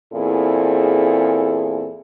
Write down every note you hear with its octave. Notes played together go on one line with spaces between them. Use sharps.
E2 A#2 C4 E4 G#4 A4